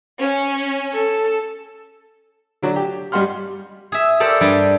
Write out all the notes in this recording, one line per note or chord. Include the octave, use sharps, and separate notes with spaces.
C#4
A4
D3 F#3 D4
G4
G2 G3 D#5 F#5 C6 F6
G#4 E5
G4 A4 A#4 C5 D5
G2 G3 G5